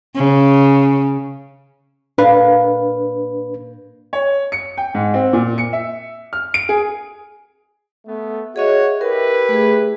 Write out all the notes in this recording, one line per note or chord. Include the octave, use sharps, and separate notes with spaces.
C#3
A#2 D4 A#4 B4 F5
C#5
C#7
G5
G#2
C4
A#2
C#7
E5
F6
D7
G#4
A3 B3
F#4 G#4 C#5 D#5 E5
E4 G4 A#4 B4
A3 G#4